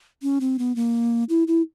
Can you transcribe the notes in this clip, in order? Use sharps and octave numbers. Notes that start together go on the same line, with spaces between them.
C#4
C4
B3
A#3
E4
E4